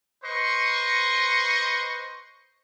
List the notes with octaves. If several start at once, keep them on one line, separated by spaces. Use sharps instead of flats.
B4 C5 D#5 C6 C#6